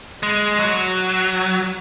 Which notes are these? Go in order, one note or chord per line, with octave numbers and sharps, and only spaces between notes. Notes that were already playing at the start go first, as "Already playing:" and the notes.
G#3
F#3